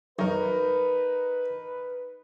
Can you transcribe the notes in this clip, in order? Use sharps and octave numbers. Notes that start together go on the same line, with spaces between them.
B1 F#2 D#4 A#4 B4 C#5